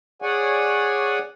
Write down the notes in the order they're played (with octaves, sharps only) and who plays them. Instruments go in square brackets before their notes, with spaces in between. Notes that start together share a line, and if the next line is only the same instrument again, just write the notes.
[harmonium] G#4 C#5 D5 F#5 G#5